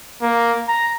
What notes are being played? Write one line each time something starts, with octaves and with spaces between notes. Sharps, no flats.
A#3
A#5